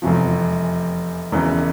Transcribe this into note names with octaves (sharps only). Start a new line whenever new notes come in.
F1 E2 C3 F3
E1 E2 C#3 E3